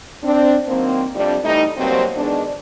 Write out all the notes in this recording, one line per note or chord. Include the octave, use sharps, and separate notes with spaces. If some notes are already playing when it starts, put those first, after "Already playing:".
C4 D4
D#3 F#3 A#3 C4
F2 C3 G3 D4
E3 G3 A3 D#4
B2 F#3 G3 A#3 C4
D#3 G#3 B3 D4